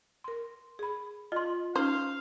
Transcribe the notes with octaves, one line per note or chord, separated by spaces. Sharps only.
A#4 C6
G#4 B5
F4 D#5 C6
C#4 D#4 C5 F5